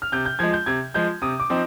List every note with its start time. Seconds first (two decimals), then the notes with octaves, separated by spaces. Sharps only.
0.02 F6
0.12 C3 G6
0.25 G6
0.39 F3 G#3 G#6
0.53 G6
0.66 C3 G#6
0.94 F3 G#3 G6
1.22 C3 D#6
1.40 D6
1.50 F3 C4 D#4